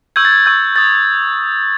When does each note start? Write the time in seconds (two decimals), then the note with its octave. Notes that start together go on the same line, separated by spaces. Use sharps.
0.16 C#6 E6 G6 G#6
0.25 A6
0.32 G#6
0.46 C#6 E6 G6
0.76 D#6 G6 A6